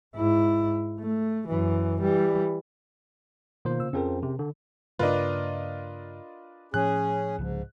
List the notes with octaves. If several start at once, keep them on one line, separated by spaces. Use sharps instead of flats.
G#2 E4
A3
F#2 E3
E3 G3
B2 D#3 A#3 F4 C5
C#3 E6
F2 F3 C4 C#4 G#4 A#4
C3
D3
G2 C#3 A#3 D4 F4 A#4 B4 D#5
A2 F3 C#4 G#4 F#6
C2 G#2 C#3 F3